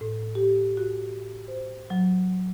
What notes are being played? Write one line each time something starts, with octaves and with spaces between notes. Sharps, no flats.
A2
G4
F#4
C5
F#3